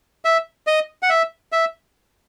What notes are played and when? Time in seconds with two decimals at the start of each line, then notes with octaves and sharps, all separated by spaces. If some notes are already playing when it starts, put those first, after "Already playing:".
0.25 E5
0.67 D#5
1.03 F#5
1.10 E5
1.52 E5